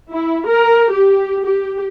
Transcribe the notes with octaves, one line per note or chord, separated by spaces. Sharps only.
E4
A#4
G4
G4